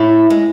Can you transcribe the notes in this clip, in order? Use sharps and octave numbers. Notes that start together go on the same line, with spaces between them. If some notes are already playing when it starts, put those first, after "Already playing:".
Already playing: A2 A3
G#3